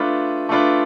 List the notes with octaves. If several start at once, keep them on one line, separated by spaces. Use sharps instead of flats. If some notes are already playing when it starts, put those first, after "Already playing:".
Already playing: A3 D4 F4 B4
A3 D4 F4 B4